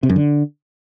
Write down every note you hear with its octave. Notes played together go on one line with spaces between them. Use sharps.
C3
F#2
D3